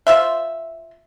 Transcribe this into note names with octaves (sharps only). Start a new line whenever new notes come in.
F4 C5 E5